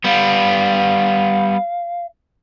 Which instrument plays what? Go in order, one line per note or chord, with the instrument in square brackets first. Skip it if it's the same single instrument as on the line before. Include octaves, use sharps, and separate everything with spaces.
[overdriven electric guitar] G3 B3 [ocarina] F5